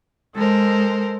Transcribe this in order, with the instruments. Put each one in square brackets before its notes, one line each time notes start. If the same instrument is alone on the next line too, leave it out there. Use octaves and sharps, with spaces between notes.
[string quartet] G#3 A4 A#4 C5